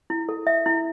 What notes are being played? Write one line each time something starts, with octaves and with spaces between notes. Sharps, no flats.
E4
A4
E5
E4